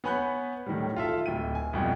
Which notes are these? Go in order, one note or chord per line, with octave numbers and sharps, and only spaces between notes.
B3 C#5 G#5 B5 F#6 G6
A2 D#3 E3 F#3 G3
F4 A4 E5
D1 G5 D#7
G#5
C2 F2 B2